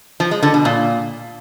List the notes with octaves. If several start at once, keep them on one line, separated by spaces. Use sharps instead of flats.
F3
G#3
D3
B2
A#2